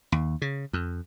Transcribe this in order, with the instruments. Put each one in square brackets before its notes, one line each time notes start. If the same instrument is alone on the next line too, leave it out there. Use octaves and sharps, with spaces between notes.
[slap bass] D#2
C#3
F2